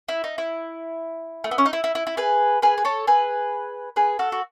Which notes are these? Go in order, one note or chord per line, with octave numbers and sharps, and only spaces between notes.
E4
D#4
E4
A3
B3
C#4
D#4
E4
E4
E4
E4
G#4 B4
G#4 B4
B4
A4 C#5
G#4 B4
G#4 B4
F#4 A4
F#4